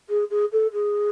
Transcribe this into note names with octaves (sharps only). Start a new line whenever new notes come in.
G#4
G#4
A4
G#4